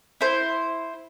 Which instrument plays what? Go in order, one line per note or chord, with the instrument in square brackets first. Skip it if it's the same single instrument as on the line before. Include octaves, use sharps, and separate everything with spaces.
[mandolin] E4 C5